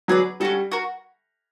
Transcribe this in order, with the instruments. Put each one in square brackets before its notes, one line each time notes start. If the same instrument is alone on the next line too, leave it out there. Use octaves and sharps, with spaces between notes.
[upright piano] F#3 [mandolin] G#4 B4 D5
[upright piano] G3 [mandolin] C#4 F#4 A4
[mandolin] F#4 A#4